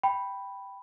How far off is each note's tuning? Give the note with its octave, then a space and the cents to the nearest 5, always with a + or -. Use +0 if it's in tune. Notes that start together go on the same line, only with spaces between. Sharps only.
G5 +0 B5 +0